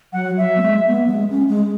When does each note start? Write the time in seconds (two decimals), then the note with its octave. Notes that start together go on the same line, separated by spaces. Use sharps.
0.13 F#3 F#5
0.37 F#3 E5
0.57 B3
0.62 G#3
0.88 B3
1.07 F#3
1.12 G#3
1.30 C#4
1.49 G#3